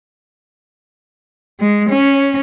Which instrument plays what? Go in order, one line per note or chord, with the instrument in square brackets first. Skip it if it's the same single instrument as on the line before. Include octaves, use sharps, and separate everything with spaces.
[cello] G#3
C#4